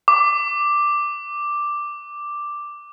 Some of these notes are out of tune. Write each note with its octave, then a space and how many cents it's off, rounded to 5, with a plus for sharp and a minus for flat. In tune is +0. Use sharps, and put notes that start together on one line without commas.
D6 +5